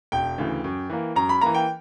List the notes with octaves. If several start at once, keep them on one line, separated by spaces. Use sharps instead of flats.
E1 G5
D2 C#3 E3
F#2
E3 A#3
F#2 A#5
B5
E3 A#3 A#5
G5